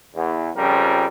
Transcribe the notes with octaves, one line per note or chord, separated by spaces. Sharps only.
E2
F2 C#3 F3 G3 A#4